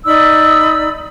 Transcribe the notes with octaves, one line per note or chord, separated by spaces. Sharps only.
D#4 D5 B5 E6